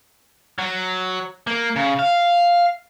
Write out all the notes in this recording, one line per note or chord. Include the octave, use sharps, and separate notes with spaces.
F#3
A#3
C#3
F5